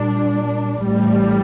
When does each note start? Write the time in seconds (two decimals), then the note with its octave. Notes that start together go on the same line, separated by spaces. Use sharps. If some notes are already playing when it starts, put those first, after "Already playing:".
Already playing: A#2 G3 D4
0.85 A1 A2 G3